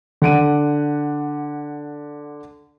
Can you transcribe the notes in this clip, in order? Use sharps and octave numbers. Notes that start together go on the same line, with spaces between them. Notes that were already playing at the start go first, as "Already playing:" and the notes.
D3 F#5 D7 D#7